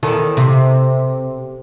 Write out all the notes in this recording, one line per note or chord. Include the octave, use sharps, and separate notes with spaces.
E2 D#3 A4
C3